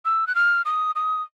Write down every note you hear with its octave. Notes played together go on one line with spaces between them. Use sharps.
E6
F#6
F6
D#6
D#6